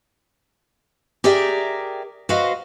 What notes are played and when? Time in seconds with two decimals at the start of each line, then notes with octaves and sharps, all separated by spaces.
1.24 G4 G#4 A#4 D5 E5 G5
2.29 F#4 B4 C5 D#5 F5